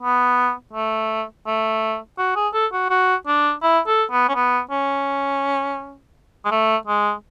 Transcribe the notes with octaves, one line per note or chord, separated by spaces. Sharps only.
B3
A3
A3
F#4
G#4
A4
F#4
F#4
D4
E4
A4
B3
C#4
B3
C#4
G#3
A3
G#3